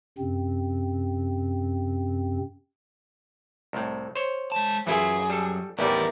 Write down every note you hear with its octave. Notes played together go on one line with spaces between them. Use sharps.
F#2 C3 C4
C2 A2
C5 C#5
G#3 A5
F#2 E3 F#3 E4 F4 G#4
G3 A4
A1 D#2 G3 B3 E4 A#4 D5